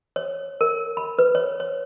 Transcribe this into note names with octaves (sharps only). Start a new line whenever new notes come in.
C#5
A#4
B5
B4
C#5
C#5